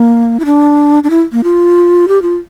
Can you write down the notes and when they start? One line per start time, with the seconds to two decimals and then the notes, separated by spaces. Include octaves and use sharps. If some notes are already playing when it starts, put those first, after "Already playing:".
Already playing: A#3
0.40 E4
0.45 D4
1.04 D4
1.10 E4
1.32 A#3
1.44 F4
2.08 G4
2.22 F4